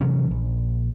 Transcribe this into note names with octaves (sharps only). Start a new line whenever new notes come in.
C3 E3 F#3 C#4
A#1